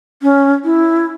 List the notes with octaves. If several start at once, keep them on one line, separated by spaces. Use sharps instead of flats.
C#4
E4